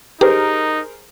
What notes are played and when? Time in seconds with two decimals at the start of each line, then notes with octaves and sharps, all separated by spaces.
0.21 D#4 G4 G#4 A#4 C5